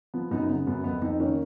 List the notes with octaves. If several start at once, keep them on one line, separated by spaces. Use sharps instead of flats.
F3 B3
F#2 B3 D#4
C#3 B3
F#2 B3
F2 B3
F2 B3 D#4
D#3 A#3 C#4